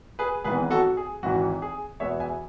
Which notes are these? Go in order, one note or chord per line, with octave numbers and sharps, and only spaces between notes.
G#4 B4
G#1 G#2 E3 B3 G#4 B4
F#4 A4
G#4
G#1 G#2 E3 F#4
G#4
E2 B2 G#3 B3 C#5 E5
E5 G#5